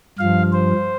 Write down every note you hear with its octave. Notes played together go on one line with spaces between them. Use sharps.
G2 F3 F5
C5